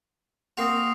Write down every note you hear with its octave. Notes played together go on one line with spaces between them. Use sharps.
A#3 C4 F#4 D#6 C7 F7